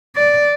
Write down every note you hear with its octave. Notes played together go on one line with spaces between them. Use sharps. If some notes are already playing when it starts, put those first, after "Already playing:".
D5